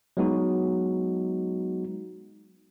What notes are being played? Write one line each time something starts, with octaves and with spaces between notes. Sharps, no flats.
F#3 G#3 B3 D#4 F#4